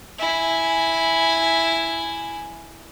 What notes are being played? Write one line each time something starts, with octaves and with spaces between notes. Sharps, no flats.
E4 G#5